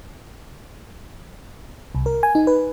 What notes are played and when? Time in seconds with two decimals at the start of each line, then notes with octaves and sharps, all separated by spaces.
1.95 C2
2.06 A#4
2.23 G#5
2.35 D#4
2.47 B4